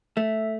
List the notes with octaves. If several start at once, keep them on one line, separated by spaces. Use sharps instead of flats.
A3 E5